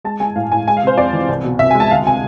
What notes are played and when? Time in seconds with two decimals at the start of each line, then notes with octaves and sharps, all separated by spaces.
0.04 G#3 A5
0.20 G#3 G#5
0.35 A2 F5
0.52 A2 G#5
0.67 G#3 G#5
0.77 F5
0.83 C3 C5
0.97 F2 D5
1.13 E3
1.29 C2
1.44 B2
1.59 C2 E5
1.71 G#5
1.75 G#3
1.80 A5
1.91 D2 F5
2.06 C3 G#5